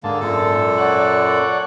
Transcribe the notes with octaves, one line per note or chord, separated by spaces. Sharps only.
G#2 D3 A#3 A5
F#2 A#2 A4
C#5 D5 F#5